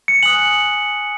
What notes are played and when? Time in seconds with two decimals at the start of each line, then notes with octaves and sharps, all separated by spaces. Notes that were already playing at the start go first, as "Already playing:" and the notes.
0.08 C#7
0.23 G#5 D#6 F#6 F#7